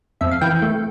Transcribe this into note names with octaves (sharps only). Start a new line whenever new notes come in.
F2 E5
F5
E3 G5
A3